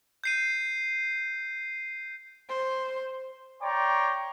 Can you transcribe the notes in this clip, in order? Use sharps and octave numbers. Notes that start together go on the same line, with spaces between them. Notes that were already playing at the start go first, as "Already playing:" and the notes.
G6 C7 D#7
C5
C#5 D5 G5 A#5 C6 D6